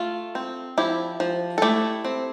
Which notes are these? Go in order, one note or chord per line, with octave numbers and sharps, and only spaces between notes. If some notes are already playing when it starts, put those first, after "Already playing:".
Already playing: A3 F4
C4
F3 E4 G4
F3
A4
A3 E4 G4
C4